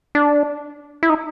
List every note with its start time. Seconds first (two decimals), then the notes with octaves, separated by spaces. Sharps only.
0.15 D4
1.03 E4
1.10 D#4